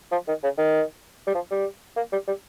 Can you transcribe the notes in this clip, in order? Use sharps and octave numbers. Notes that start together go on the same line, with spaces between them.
F3
D#3
C#3
D#3
G3
F3
G3
A#3
G3
G3